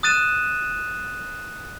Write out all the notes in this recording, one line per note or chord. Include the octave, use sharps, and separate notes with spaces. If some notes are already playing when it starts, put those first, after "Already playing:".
D#6 F#6 A6 D#7 E7